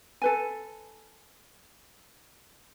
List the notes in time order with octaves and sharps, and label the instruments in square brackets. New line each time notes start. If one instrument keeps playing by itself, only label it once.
[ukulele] A4 B4 G#5